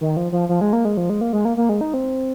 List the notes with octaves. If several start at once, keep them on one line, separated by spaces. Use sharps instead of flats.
D#3
F3
F3
F3
G#3
A#3
G#3
F3
G#3
A#3
G#3
A#3
A#3
G#3
D#4
C4